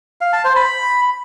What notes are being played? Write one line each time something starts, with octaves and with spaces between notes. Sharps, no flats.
F5
A5
C5
B5